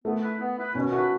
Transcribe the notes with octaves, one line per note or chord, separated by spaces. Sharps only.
A3 B3
E4 B4
B3
E4 B4
B2 C#4
A3 E4 F#4 B4